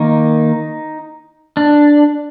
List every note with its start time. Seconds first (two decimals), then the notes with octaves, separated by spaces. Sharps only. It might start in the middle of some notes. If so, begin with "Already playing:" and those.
Already playing: D#3 A#3 D#4
1.57 D4